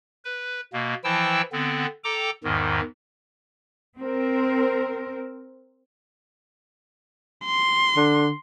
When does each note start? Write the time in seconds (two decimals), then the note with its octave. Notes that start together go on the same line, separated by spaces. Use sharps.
0.25 B4
0.73 B2 A#3
1.04 E3 F3 E4 G5 A5 E6
1.52 D3 B3 C4
2.04 A4 G5 A#5 D6
2.44 E2 G#2 D#3
3.98 C4 A#4
7.45 C6
7.96 D3